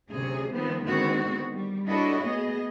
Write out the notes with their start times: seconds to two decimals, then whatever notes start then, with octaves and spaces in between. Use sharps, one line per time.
0.10 D2 C3 F#3 C#4 G#4
0.53 D#3 F3 G3 B3 C4
0.83 D3 D#3 G#3 B3 C4 F#4
1.52 G3
1.88 D4 E4 F#4 A4 C#5 D#5
2.23 A3 B3 G#4 D#5